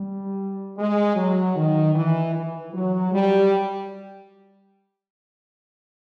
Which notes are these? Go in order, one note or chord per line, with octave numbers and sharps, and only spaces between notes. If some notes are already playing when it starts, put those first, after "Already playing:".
Already playing: G3
G#3
F#3
D#3
E3
E3
F#3
G3